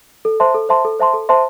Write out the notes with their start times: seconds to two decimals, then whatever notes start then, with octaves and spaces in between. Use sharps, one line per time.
0.25 A4
0.40 C5 E5 A5 C6
0.55 A4
0.69 C5 E5 A5 C6
0.85 A4
0.99 C5 E5 A5 C6
1.13 A4
1.29 C5 E5 A5 C6